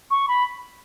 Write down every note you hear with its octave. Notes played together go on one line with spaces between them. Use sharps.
C#6
B5